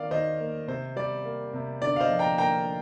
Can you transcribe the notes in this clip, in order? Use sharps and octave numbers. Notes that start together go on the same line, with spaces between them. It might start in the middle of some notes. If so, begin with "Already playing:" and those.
Already playing: D#3 A#3 D5 F5
D#3 C5 D#5
A#3
C3 C5
G3 D5
A#3
C3
D3 D5
F5
C5 D#5
F3
G5 A#5
A#3 G5 A#5